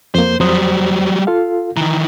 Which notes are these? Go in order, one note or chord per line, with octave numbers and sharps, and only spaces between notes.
F2 A#3 C5
F2 F#3 G3 C5 D#6
F4 A4 F5
D#3 E3 A#5